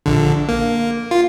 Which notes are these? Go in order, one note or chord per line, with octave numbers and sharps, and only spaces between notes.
A#1 D3
A#3
F4